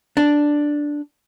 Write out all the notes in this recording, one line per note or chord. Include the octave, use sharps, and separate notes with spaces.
D4